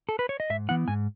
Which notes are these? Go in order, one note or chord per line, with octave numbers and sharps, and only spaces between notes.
A4
B4
C#5
D#5
G#2 E5
E3 B3 E4 F#5
G#2 G#5